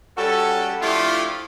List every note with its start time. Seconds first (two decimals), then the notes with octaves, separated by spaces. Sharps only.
0.17 G3 C#4 F#4 A4
0.81 F3 A3 D4 E4 F4 G4